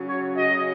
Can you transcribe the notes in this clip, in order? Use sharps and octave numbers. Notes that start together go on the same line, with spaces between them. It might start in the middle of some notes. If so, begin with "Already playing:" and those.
Already playing: C#3 F#3
C#5
C#3 F#3 D#5